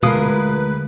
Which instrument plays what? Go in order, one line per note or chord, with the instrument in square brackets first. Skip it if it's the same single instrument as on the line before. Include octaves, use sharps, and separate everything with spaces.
[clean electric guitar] D2 G#3 [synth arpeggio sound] B2 D#6 C7 [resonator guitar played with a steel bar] F3 A#4 [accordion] B4